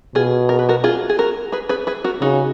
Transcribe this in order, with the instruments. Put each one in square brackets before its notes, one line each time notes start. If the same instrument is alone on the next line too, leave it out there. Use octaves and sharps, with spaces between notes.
[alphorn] B2 [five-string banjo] F4 G#4
[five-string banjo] A#4
B4
F#4 A#4
F4 G#4
G#4
F#4 A#4
G#4 B4
G#4 B4
G#4 B4
F#4 A#4
[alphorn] C#3 [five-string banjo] D#4 F#4